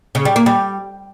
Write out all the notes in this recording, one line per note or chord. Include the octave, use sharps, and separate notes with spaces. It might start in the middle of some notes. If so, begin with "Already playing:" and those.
C#3
G3
A#3
G3